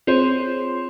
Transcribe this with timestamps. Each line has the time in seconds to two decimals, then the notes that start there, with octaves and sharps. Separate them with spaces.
0.07 C4 F4 G#4 C5 C#5